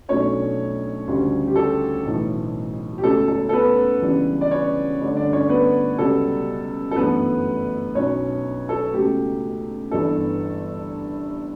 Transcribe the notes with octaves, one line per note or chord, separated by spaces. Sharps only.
B1 B2 A3 C#4 D4 C#5
D2 C#3 G3
G4
A4
B1 A2 E3
G4
C#2 B2 A3 C#4 A4
A4
A4
B3 B4
C#2 C#3 E3 G3 D4
D5
C#4 C#5
G2 D3 A3 D4
D4 D5
C#4 C#5
B3 B4
C#2 B2 G3 B3 A4
A4
G1 F#2 E3 A3 B3 B4
B1 B2 F#3 C#4 C#5
A4
C#2 B2 A3 G4
G1 G2 E3 B3 A4